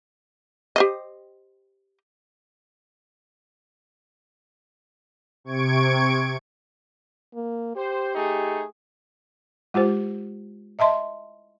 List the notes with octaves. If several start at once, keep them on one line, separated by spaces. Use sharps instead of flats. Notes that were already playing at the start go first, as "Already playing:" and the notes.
G4 C5 D#5
C3 C#6 G#6 D7
A#3
G4 C5
A3 D#4 G#4
G#3 F4 G4 C5
D#5 E5 A5 C6